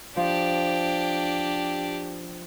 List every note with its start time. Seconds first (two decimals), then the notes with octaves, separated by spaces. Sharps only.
0.16 F3 D4 G4